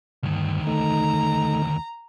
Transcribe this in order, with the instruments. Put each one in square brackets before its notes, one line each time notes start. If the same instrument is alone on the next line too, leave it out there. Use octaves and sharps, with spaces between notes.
[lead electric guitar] D2 D#3 [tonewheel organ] G2
[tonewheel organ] A3 D#4 [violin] A#5